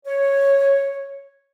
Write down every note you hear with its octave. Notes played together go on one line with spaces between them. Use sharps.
C#5